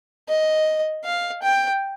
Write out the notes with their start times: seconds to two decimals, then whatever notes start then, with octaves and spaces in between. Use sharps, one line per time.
0.29 D#5
1.04 F5
1.42 G5